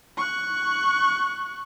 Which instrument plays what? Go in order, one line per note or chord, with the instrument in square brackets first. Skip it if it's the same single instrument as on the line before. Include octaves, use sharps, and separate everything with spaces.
[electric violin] C#6 F#6